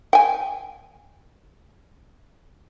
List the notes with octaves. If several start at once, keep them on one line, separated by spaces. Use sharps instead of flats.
G5 G#5